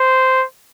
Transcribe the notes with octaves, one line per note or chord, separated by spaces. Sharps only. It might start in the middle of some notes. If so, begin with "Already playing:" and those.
Already playing: C5